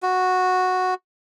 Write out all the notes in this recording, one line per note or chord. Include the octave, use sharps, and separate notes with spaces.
F#4